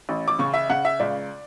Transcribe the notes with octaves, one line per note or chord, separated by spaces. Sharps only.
A1
D6
C#3 C#6
E5
C#3 F#5
E5
C#2 D5